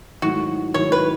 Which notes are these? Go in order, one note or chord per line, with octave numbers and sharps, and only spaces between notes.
G#2 D#3 F#3 A3 E4 F#4
G#2 D#3 F#3 A3 E4 C#5
B4